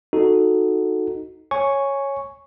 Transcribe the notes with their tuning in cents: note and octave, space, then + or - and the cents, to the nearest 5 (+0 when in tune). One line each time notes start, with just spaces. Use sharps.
D#4 +0 F#4 -5 A4 +0
C#5 -5 G#5 +0 C#6 +0